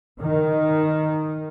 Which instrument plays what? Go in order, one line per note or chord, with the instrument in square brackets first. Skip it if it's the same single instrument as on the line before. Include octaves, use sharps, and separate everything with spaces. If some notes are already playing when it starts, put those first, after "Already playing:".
[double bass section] D#3